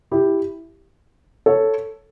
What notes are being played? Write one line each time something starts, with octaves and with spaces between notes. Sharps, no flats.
E4 G4
A4 C#5